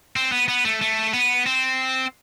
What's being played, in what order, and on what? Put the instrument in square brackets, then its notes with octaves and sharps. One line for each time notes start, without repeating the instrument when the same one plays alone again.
[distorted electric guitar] C4
B3
B3
A3
A3
B3
C4